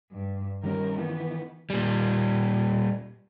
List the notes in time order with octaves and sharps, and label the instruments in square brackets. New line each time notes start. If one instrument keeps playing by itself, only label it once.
[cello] G2
[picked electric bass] D#3 G3 C#4 [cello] A#4
[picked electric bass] D#3 E3 [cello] B3
[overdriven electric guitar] A#2 G3